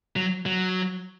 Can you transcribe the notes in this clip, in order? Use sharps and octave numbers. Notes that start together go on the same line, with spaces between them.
F#3
F#3